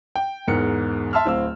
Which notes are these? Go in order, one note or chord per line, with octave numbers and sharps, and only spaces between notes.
G5
E2 G#2 A#4 C#7
E5 A5 C6 E6 F6
D1 C4 F5 E6